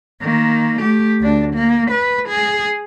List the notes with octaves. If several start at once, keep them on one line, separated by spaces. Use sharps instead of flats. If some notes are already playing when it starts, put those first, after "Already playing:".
D#3 A#3
A3 G4
D2 D4
A#3
B4
G#4